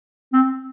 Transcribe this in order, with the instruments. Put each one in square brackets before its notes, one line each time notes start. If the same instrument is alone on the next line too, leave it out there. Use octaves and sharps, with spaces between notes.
[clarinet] C4